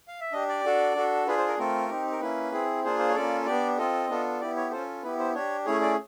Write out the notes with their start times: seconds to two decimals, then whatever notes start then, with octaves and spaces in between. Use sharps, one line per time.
0.08 F5
0.21 E5
0.32 D4 G4 D#5
0.49 D5
0.65 D4 F#4 A4
0.95 D4 F#4 A4
1.27 D4 F4 G#4 B4
1.38 C5
1.48 A#4
1.58 A3 C4 F4 A4 A#4
1.89 C4 D#4 G4
2.11 A#4
2.21 A#3 C#4 E4 B4
2.52 C4 E4 G#4
2.84 A#3 D4 F4 G#4 C5
2.99 C5
3.09 C#5
3.14 A#3 C#4 F4 A4 D5
3.46 B3 D4 G4 D5
3.78 C4 F4 A4 D#5
4.10 B3 D4 F4 A4
4.40 B3 E4 G4 D5
4.56 C#5
4.71 C#4 F4 A4 C5
5.03 B3 E4 G4 B4
5.19 C5
5.34 D4 G4 C#5
5.66 A3 C#4 E4 G#4 C#5
5.81 D5